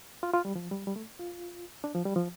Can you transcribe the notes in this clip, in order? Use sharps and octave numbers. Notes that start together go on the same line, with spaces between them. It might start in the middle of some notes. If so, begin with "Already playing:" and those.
F4
F4
G3
F3
G3
G3
A3
F4
D4
F3
G3
F3